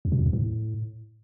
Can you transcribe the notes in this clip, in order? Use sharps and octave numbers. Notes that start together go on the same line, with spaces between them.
F2
B2
F2
E2
A2